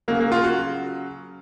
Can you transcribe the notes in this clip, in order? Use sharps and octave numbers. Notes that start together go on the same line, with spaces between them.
C#3 F#3 A#3
A#3
F4
F#4